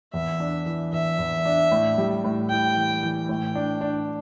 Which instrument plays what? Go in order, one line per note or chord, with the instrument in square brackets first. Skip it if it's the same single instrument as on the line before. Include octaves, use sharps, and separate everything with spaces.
[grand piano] E2 [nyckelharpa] E5
[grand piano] D4
E3
[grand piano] E2 [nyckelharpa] E5
[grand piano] E2
D4
A2
G3
A2
[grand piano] E4 [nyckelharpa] G5
[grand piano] E3
E3
[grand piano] A2 [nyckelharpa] G5
[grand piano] D4
D4